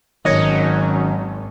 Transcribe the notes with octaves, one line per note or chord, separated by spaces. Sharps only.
G#1 D#3 F#3 C#4 D#4 C#5 D#5